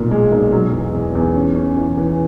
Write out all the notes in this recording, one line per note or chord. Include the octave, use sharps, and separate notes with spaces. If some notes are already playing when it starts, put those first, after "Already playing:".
Already playing: B1 A#2
G#3
B1
F#3
E2
E2
E2
C#4
C#4
E3
E3